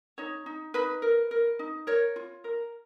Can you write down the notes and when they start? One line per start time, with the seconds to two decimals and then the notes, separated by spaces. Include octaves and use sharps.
0.18 D#4 C#5
0.46 D#4
0.74 D#4 B4
1.02 A#4
1.31 A#4
1.59 D#4
1.87 A#4 C#5
2.16 F4
2.44 A#4